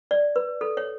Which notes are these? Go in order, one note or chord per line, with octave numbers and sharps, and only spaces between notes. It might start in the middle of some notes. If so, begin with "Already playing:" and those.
D5
B4
A4
C#5